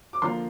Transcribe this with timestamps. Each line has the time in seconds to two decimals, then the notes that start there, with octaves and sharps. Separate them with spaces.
0.13 D6
0.22 D3 F3 A#3 F4 C6